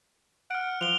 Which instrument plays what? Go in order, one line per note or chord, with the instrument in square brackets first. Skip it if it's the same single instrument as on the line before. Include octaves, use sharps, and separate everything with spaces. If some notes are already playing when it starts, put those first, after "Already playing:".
[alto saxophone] F#5 [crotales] F6 D7
[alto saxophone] F3 [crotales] F7 G7